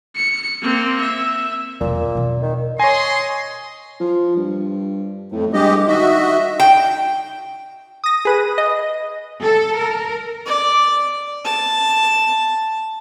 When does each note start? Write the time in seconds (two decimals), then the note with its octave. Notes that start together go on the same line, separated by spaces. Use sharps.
0.16 C#7
0.62 A#3 C4
1.01 E5
1.81 E1 F2 A#2
2.15 B2 C4
2.42 D#3
2.80 C#5 D#5 G#5 C6
4.00 F3
4.37 G2
5.32 F2 A2
5.53 G2 G#3 G4 D#5
5.88 D#3 F#4 D#5 E5
6.60 G5
8.04 D#6 A#6
8.25 G#4 B4 D#7
8.58 D#5
9.42 A4
9.77 A#4
10.46 D5
11.45 A5